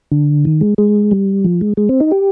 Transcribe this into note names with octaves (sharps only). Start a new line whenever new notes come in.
D3
D#3
G#3
G#3
G3
F3
G#3
G#3
C4
D#4
G4